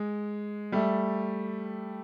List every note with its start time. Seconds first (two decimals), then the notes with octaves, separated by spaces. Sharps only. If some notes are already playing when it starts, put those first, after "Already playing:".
Already playing: G#3
0.72 G3 A3